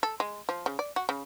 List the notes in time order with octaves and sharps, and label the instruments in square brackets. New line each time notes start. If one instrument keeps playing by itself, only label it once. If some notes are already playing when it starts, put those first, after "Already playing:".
[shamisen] A4
G#3
F3
C#3
D5
F#4
C#3